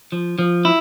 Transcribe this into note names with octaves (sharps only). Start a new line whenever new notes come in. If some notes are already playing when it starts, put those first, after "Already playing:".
F3
F3
E4